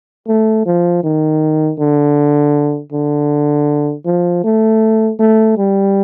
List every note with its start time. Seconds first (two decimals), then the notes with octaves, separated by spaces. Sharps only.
0.28 A3
0.66 F3
1.04 D#3
1.79 D3
2.92 D3
4.06 F3
4.44 A3
5.20 A3
5.58 G3